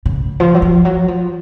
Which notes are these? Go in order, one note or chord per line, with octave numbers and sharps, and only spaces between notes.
C#3
F3
F#3
F3
F#3
F3